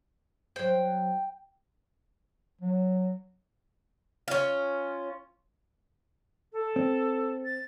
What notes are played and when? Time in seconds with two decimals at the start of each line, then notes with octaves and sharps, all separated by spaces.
0.56 F#3 C5 G5
2.61 F#3
4.28 C#4 F4
6.52 A4
6.76 C4
7.44 A6